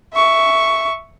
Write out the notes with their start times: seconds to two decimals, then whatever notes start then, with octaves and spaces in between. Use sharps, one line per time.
0.14 E5 C#6